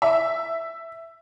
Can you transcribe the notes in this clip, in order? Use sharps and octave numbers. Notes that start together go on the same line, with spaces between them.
E5